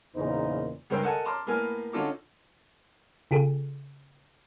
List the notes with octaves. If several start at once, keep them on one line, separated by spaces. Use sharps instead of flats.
E2 A#2 C#3 D#4 A#4 C5
C#2 G2 A#4 C5 G5 E6
A4 A#4 D#5 F#5 G#5 A5
A5 A#5 C6 D6 F6
A2 A#3 B3 A#4 G#5 F6
D3 C#4 D#4 F4 A4 D6
C#3 F4 G#4 A4